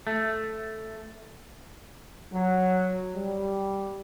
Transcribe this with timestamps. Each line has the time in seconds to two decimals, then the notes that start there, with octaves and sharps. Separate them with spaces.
0.07 A3
2.32 F#3
3.15 G3